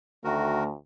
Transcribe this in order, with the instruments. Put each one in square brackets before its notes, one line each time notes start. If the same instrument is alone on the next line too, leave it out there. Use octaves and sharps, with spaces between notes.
[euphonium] D2 [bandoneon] D#3 F#4 A#4 [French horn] A3